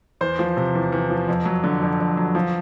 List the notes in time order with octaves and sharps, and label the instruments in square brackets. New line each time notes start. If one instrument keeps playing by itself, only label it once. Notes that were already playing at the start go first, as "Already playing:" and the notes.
[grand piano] E2 C5
F3
C3
E2
E2
F3
F2
F#3
D3
F2
F2
F#3
F3